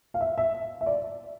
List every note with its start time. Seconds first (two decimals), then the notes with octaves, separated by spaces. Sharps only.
0.14 F5
0.21 E5
0.38 E5
0.81 E5
0.86 D5